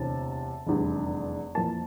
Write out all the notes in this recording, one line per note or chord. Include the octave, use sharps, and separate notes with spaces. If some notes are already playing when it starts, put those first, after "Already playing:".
Already playing: E1 D2 C3 E3 A5
F1 E2 D3 G3
F2 E3 A#3 A5